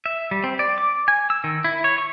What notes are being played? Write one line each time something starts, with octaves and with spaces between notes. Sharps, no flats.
E5
G3
C4
D5
D6
G#5
E6
D#3
E4
C#5
C#6